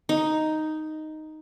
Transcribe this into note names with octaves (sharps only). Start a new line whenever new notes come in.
D#4